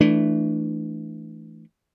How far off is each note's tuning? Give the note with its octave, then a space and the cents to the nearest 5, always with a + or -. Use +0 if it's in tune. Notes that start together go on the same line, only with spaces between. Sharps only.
E3 +0 A3 +0 D4 +10